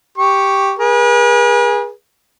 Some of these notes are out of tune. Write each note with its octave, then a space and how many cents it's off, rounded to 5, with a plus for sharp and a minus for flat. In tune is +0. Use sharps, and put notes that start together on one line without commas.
G4 +0 C#6 +0
G#4 -15 B4 -45